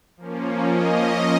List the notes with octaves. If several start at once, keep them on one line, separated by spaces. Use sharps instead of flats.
F3 A#3 C#4
D#5